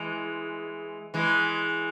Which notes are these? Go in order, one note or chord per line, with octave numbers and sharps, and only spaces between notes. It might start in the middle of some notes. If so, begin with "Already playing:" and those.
Already playing: E3 G#3
E3 G#3